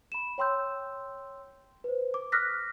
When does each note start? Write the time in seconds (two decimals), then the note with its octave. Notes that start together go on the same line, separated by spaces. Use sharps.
0.12 B5 E7
0.38 C#5 G5 C6 E6 G6
1.84 B4 C5
2.14 D6
2.32 D6 D#6 F6 F#6 A#6 B6